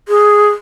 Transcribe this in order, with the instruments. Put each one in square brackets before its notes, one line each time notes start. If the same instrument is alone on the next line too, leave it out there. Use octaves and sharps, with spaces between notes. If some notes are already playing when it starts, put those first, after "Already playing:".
[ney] G#4